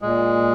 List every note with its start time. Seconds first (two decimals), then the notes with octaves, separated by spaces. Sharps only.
0.02 A#2 G#3